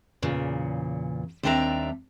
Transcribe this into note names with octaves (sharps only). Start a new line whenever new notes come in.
E2 A#2 C#3
D#2 G3 C4 D4 E5 A#5